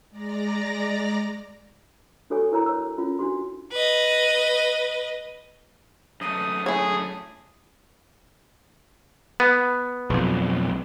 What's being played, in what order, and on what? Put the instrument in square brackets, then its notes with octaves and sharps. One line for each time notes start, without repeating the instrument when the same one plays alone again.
[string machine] G#3 D5 A#5 A#6
[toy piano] D4 F#4 A4 C#5 G#5 C#6
E4 A#4 C#5 A#5
C#5 E6
C#4 F4
D4 F#4 C6
[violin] B4 D#5
[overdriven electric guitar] F#2 A3 [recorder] D#6
[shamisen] E4 C#5 [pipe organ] G#4
[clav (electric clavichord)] B3
[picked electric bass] B1 F2